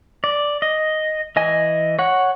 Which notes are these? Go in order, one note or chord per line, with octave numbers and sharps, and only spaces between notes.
D5
D#5
E3 D#5 G#5
C#5 F#5